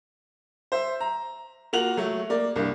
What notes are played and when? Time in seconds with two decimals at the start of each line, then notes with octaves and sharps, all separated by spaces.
0.72 C5 E5
1.00 A#5
1.73 A#3 F4 F#4 F7 F#7
1.97 F#3 A3
2.30 A#3 D5
2.56 C2 G2 A#3